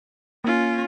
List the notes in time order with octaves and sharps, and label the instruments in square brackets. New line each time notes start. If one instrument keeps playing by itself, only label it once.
[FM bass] A#3 [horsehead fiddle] C#4 F4